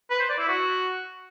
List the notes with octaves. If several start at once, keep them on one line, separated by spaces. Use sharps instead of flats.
B4
C5
D5
E4
F#4